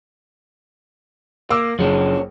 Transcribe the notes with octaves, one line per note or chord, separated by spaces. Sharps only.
A#3 D6 E6
F#1 F3 C#4 D4